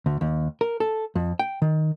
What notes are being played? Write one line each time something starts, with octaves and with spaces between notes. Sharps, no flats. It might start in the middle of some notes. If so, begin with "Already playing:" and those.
D2
D#2
A#4
A4
F2
G5
D#3